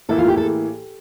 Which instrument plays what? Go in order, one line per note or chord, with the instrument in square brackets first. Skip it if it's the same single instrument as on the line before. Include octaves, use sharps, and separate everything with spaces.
[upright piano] A2 E3 A#3 E4 [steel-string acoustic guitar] A4
[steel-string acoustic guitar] F4
G4
A4